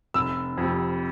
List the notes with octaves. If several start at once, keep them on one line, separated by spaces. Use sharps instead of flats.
F1 E6
F2 C3